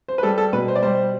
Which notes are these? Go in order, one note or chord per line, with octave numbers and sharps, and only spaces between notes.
C5
B4
G3 A4
A4
B2 B4
C5
D5
G3 C5